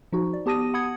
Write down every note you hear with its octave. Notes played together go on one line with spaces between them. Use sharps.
F3 D#4 F#4
D5
B3 G4 A5 D#6 A#6 D#7
F#5 B5 D#6 G#6 C#7